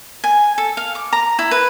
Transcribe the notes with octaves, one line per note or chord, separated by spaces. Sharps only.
G#5
A4
F5
D6
A#5
E4
B4